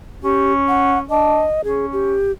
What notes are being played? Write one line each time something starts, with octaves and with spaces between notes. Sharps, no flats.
C#4 G4
F#5
D4 D#5
C#4 G#4
G4